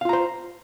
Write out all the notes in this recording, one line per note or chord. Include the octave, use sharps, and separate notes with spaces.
F4 C5 F5 A#5